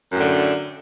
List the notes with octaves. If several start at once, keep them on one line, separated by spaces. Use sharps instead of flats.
F#2 A2 D3